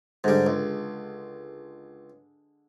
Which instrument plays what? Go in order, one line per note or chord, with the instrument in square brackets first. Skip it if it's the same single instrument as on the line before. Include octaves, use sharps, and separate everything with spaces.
[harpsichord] G#2 G3 [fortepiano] D3 G#3
[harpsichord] C#2